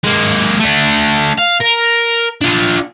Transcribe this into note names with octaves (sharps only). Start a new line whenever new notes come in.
G#3 A#3
A3 D4
F5
A#4
D4 F4